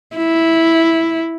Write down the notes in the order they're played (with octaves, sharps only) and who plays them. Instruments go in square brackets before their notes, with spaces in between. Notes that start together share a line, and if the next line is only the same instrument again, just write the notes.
[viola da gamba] E4